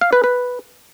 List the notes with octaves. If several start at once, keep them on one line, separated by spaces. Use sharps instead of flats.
F5
B4
B4